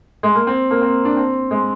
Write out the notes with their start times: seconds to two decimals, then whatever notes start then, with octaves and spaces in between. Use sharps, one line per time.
0.23 G#3
0.35 A#3
0.47 C4
0.71 A#3
0.81 C4
1.05 D4
1.17 C4
1.51 G#3